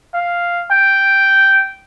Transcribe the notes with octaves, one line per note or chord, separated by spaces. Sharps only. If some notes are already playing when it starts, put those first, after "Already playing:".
F5
G5